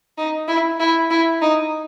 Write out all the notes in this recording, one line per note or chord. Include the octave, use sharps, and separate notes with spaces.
D#4
E4
E4
E4
D#4